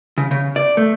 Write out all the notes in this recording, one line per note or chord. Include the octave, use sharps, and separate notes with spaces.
C#3
C#3
D5
A3